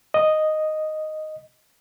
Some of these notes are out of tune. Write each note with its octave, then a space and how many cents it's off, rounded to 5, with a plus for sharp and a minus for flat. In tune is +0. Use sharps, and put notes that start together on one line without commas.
D#5 -5